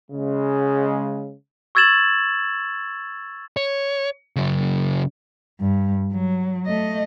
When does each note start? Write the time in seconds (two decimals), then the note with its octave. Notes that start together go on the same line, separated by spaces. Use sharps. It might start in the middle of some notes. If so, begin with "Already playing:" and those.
0.11 C#3 G#3
1.75 C#6 E6 G#6 A6 E7 F#7
3.57 C#5
4.36 C#3 F#3
5.60 G2
6.12 F#3
6.66 A3 D#5